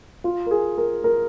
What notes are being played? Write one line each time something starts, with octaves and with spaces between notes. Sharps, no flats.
F4
A#4
G#4
A#4
A#4